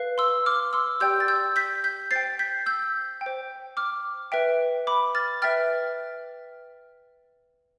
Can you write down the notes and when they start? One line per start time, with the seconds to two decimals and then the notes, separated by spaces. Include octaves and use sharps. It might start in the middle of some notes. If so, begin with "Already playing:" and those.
Already playing: B4 F5
0.18 C6 E6
0.46 D6 F6
0.73 C6 E6
1.00 G4 D5 G5 E6 G6
1.20 A6
1.28 E6 G6
1.56 G6 B6
1.84 G6 B6
2.11 C5 G5 A6 C7
2.39 G6 B6
2.66 E6 G6
3.21 G5
3.26 C5
3.77 D6 F6
4.32 B4 E5 G5
4.87 B5 D6
5.15 F6 A6
5.42 B4 E5 G5 F6 A6